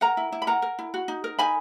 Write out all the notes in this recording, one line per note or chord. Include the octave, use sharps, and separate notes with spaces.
A#4 F#5 A#5
E4
E4
B5
A#4 F#5 A#5
A#4
E4
F#4
D#4
A#4
D#4 G#5 B5